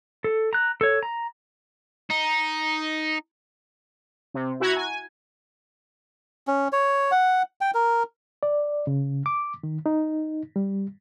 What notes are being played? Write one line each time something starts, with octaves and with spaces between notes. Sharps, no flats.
A4
A#5 F#6
A4 C#5
A#5
D#4
C3
E4 F#4 F#5 A#5 G#6
G#5
C#4
C#5
F#5
G5
A#4
D5
C#3
D6
D#3
D#4
G3